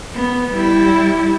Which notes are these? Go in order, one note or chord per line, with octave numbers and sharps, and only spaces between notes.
B3
G3 E4